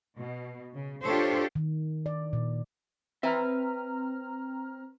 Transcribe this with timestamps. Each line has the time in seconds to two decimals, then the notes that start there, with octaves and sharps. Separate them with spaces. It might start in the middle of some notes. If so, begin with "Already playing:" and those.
0.17 B2
0.74 C#3
1.06 D4 F4 G4 A4 C5 C#5
1.55 D#3
2.06 D5
2.33 A#2
3.23 C4 B4 E5 A#5 F6